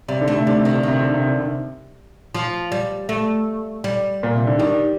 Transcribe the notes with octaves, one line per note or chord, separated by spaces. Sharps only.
C3 G3
D3
A3
C3
D3 G3
C3 D#3
D3
C3 D#3
D3
C3
D3
C3
F3
G3
A3
G3
A#2
C3
D3
D#3 G3